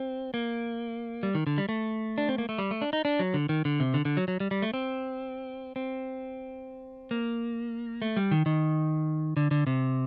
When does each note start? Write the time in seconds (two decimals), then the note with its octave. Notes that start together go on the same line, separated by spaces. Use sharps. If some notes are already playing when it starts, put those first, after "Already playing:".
Already playing: C4
0.34 A#3
1.23 G3
1.35 D#3
1.47 D3
1.58 G3
1.69 A3
2.18 D4
2.29 C4
2.38 A#3
2.49 A3
2.58 G3
2.71 A3
2.82 D4
2.93 D#4
3.05 D4
3.19 F#3
3.34 D3
3.49 D#3
3.65 D3
3.80 C3
3.94 D3
4.05 D3
4.17 F#3
4.28 F#3
4.40 G3
4.51 G3
4.62 A3
4.74 C4
5.76 C4
7.11 A#3
8.02 A3
8.17 G3
8.31 D#3
8.46 D#3
9.37 D3
9.51 D3
9.67 C3